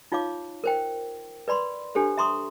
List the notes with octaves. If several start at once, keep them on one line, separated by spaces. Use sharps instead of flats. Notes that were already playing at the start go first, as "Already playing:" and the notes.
D#4 F4 C#5 F5 D6
A#4 C5 G5
B4 D5 B5 C6
D4 G4 A4 C5
E5 A#5 C6 C#6 D#6